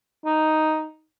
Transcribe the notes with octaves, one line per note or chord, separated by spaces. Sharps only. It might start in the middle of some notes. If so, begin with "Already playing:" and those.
D#4